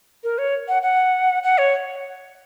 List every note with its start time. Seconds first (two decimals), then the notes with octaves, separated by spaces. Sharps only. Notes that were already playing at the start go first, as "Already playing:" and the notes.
0.23 A#4
0.38 C#5
0.68 F#5
0.82 F#5
1.43 F#5
1.58 C#5